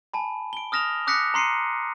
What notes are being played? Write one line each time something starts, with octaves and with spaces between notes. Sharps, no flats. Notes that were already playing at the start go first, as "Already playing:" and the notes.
G#5 A5 B5
D7 G7
D#6 F6 A#6 E7 F7
D6 D#6 F#6 A#6 B6 C#7
A#5 C6 C7 C#7 D#7